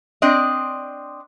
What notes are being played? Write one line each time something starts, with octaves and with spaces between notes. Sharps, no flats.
C4 D4 D5 D#5